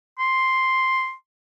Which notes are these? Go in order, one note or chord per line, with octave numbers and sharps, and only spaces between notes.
C6